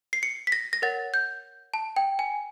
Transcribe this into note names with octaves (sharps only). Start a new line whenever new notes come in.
C7
C#7
B6
A#6
A#6
A#4 C#5 F#5 A6
G6
A5
G5
G#5